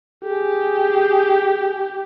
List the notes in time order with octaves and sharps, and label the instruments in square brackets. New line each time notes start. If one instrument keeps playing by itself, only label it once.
[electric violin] G4 [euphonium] G#4